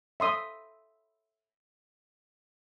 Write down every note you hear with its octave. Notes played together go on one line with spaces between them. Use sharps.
E5 C6 D#6